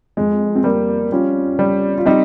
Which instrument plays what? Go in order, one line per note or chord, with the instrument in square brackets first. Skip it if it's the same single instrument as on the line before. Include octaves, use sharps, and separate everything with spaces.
[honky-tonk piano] F2 [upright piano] G#3
[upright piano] C4
[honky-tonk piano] G3 [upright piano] A#3
[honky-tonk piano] G3 [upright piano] C#4 F4
[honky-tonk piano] G3
[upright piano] F4
[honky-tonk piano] G3 [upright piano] C4 D#4